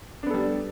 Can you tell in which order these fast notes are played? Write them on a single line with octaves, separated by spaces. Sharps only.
D4 B3 A4 G3